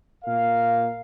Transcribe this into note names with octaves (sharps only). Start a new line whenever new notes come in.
A#2 A#4 F5